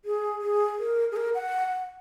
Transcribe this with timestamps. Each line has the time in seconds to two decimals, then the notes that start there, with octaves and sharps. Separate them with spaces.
0.05 G#4
0.41 G#4
0.79 A#4
1.12 G#4
1.16 A#4
1.35 F#5